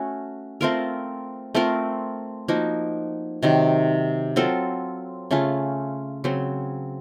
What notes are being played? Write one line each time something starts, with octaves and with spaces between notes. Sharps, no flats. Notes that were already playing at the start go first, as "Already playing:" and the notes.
Already playing: A3 C#4 F#4
A3 C4 F4 A#4
A3 C4 F4 A#4
F3 A#3 D#4 F#4
C3 D#3 F#3
F#3 C4 F4 A4
C#3 A3 C#4 F4
C#3 F#3 C4